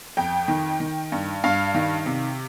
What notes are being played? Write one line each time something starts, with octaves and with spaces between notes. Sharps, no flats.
F2 G5
D#3
D#3
G2
G2 F5
D#3
C3